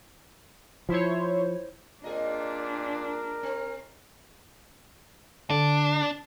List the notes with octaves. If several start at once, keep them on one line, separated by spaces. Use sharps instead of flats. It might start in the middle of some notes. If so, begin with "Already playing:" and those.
F3 E4 C5 C#5
A#2 C4 D4 G#4 A#4 D#5
A#4
C4
D3 D4